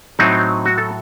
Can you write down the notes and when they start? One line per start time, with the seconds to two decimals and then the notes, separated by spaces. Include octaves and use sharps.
0.19 A2 F#3 C4 D#4
0.65 F#4
0.78 A4